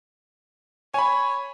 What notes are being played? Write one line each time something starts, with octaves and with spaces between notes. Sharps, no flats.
C#5 G#5 B5